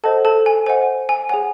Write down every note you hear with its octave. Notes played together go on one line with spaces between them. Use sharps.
A4 C5 D#5 F#5 A5
A4 A5
G#5
C5 D#5 F#5 G#5
G#5
G#4 C#5 F#5 G#5